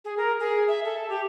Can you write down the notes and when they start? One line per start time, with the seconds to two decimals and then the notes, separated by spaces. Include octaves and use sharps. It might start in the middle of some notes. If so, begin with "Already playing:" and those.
0.05 G#4
0.18 A#4
0.40 G#4
0.68 E5
0.84 A4
1.09 G4